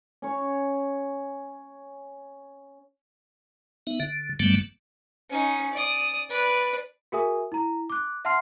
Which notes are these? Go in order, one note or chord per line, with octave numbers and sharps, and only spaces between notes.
C#4 C#5
B3 D#4 E5
D3
G2 D3 F#3 G3 A3 B3
C#4 D#4
D5 D#6
B4 D5
F#4 G#4 A#4 E5 G#5 D#6
E4 A#5
D6 F#6
E5 F#5 A5 C6 F6 C7